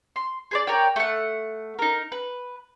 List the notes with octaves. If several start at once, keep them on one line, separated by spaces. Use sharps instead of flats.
C6
G#4 C5 D5
A#4 C#5 D5 G5
A3 F#5
D#4 A#4
B4